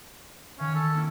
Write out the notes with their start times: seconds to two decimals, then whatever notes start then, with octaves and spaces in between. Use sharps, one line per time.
0.59 D#3 C#4 F5
0.75 A4
0.94 A#3 C4 E4